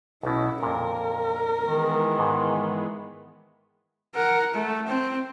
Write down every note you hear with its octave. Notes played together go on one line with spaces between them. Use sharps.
B1 B2 C#4 E4
F2 A#2 A#4
D#3 E3 G#3 B3
G#2
A#4 F#5
A3
C4